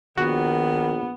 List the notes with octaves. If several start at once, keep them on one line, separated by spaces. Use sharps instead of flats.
A#1 D#3 B3 F#4